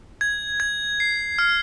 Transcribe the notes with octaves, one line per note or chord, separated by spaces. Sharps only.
G#6
G#6
C7
F6